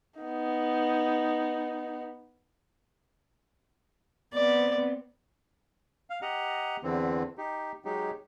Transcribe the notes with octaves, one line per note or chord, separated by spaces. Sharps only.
B3 D#4
B3 C4 D5
F5
G4 D#5 F#5 A#5
E2 D3 E3 C4
D#4 G4
F#3 G#3 D#4 G4